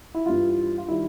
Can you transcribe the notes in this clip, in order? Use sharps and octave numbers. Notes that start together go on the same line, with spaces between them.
E4
G2 E3 G3 F4
F4
D#3 G3 E4